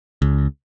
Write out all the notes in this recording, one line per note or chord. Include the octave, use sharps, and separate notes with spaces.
C#2